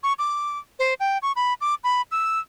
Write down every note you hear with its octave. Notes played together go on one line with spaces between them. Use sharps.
C#6
D6
C5
G5
C#6
B5
D6
B5
E6